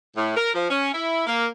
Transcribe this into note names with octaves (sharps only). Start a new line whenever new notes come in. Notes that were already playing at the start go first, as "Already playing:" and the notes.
A2
A#4
F3
C#4
E4
A#3